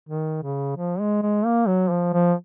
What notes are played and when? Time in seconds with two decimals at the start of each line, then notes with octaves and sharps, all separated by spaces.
0.09 D#3
0.43 C#3
0.77 F3
1.00 G#3
1.22 G#3
1.46 A#3
1.68 F#3
1.90 F3
2.13 F3